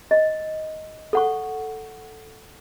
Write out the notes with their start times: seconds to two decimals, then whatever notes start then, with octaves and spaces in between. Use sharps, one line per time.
0.11 D#5
1.13 A4 F#5 C#6